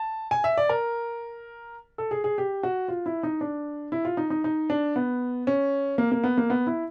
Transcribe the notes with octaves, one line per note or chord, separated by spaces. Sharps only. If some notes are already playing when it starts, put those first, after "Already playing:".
Already playing: A5
G#5
E5
D5
A#4
A4
G#4
G#4
G4
F#4
F4
E4
D#4
D4
E4
F4
D#4
D#4
D#4
D4
B3
C#4
A#3
A#3
B3
A#3
B3
E4